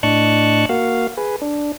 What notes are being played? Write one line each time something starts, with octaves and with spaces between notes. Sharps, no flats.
A2 D4 D#5 A5 C#6 F#6
A#3 F#4 F5
G#4 B4
D4